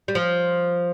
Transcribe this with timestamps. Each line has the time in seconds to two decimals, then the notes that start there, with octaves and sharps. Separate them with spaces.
0.08 G3
0.15 F3